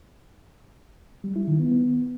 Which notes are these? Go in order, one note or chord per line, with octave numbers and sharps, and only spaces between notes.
G3
E4
D#3
B3
B3